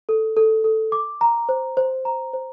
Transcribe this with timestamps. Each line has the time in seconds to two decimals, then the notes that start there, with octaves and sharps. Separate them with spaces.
0.09 A4
0.37 A4
0.64 A4
0.92 D6
1.21 A#5
1.49 C5
1.77 C5
2.05 A#5
2.33 C5